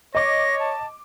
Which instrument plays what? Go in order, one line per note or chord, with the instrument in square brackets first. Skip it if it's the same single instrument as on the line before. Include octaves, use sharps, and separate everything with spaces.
[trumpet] C#5 [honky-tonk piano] D#5 D6 [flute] A#6
[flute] A5